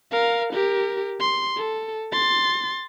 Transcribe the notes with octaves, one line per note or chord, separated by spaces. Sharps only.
A#4 F5
G4 A#4
C6
A4
C6 A6